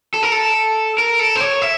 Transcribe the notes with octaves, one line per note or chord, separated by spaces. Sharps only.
A4
A#4
A4
A#4
A4
C5
C#5
E5